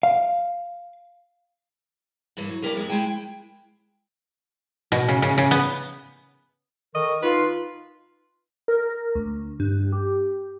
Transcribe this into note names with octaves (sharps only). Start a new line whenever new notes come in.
F5
G2 E3 A#3
F#3
A#3 D4 G4 A#4 B4
F2 D#3 G#3 E4
G#3 E4 G5
B2
C#3
C#3
C#3
B3
D#3 A4 A#4 D#5 C#6
D#4 F4 B4 C6
A#4
D2
G2
G4